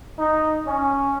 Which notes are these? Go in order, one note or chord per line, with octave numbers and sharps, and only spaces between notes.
D#4
C#4